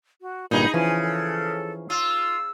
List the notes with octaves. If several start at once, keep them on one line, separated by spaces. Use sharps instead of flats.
F#4
G1 G2 A#2 D#4 G#4 B5
C#3 E3 F3 C#4 G#5
A4
F4 E6